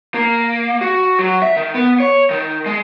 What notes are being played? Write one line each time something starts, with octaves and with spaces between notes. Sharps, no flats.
A#3
F#4
F#3
E5
D#3
B3
C#5
D#3
G#3